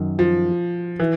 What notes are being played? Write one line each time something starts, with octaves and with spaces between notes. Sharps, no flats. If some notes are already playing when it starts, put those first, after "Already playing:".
Already playing: F#2 D#3
F3
E3